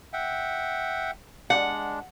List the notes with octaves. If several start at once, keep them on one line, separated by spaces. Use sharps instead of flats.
E5 F#5 G5
G#3 D4 F#5